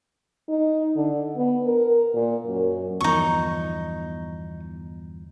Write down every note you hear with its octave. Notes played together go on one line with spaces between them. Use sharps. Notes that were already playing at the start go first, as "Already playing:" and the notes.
D#4
D3
B3
A#4
A#2
F#2
G1 E2 F3 D#4 C#6